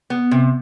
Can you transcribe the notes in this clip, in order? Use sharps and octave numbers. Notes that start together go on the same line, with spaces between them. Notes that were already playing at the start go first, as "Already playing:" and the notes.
B3
C3